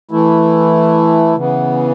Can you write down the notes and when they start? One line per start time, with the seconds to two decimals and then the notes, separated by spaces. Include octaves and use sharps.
0.11 E3 A3 E4
1.36 C#3 E3 B3